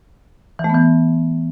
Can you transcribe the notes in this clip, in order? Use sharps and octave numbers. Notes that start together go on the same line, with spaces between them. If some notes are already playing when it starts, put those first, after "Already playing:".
E3
A3
B3
E3